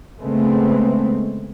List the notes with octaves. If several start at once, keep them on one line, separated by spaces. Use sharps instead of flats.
C#3 G#3 A3 B3 C4